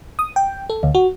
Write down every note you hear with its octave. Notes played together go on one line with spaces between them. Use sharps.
D#6
G5
A4
D2
F#4